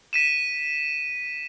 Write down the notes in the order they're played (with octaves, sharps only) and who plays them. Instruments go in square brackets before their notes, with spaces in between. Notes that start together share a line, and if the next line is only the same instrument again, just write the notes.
[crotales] B6 D#7 E7